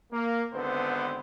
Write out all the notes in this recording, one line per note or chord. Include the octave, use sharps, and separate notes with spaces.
A#3
G#1 D3 B3 C4 B4 C5